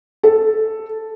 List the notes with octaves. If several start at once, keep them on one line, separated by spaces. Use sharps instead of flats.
A4